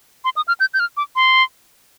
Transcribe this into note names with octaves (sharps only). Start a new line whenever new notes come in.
C6
D#6
F6
G6
G6
F6
D6
C6